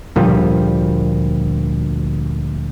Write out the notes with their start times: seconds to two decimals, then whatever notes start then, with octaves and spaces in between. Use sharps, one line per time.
0.16 D2 A#2 F3 G3